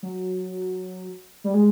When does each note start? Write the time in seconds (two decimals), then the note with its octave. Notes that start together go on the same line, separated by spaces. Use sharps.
0.03 F#3
1.44 G3
1.54 G#3